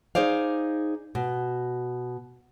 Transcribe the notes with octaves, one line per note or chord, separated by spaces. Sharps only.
D#4 G#4 C5 D5 F5
B2